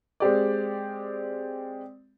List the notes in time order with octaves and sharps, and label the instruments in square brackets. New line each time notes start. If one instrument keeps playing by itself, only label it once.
[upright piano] G#3 C4 G4 D5